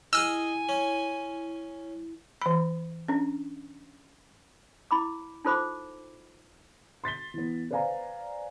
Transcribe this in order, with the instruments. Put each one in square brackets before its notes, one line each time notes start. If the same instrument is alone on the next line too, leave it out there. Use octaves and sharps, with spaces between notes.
[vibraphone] E4 [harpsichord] G#4 D#5 [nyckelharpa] G#5 [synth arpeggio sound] E6 F6
[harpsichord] C#4
[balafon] E3 B5
C#4 D4
[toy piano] E4 B5 D6
D#4 F4 A4 C5 B5 D6
[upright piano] C6 A6 B6 G7
E3 B3
B4 C5 D5 F5 G#5 A#5